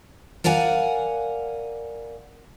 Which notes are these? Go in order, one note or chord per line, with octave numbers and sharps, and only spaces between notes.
A#4 D5 F5 F#5 G#5